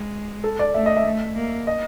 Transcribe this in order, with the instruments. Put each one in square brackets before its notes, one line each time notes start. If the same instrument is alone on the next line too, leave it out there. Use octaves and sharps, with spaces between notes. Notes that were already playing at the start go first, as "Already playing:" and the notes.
Already playing: [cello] G#3
[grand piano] A4
D5
[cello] A3 [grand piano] E5
[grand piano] D#5
E5
[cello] A3
A#3
[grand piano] D#5